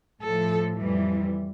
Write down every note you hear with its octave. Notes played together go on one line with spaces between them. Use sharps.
A2 F3 A4
F2 E3 G3